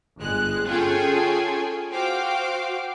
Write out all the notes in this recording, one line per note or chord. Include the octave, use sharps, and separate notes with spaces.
G1 G#3 F#6
C#4 F4 G#4 A4 G5 G#5
F#4 C5 F5 G5 D6